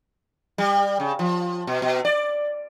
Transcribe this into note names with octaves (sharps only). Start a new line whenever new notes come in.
G3
C#3
F3
B2
B2
D5